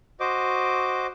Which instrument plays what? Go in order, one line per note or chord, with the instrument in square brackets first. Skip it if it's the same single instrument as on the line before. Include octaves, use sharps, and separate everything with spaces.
[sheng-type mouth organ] F#4 C5 D#5 D6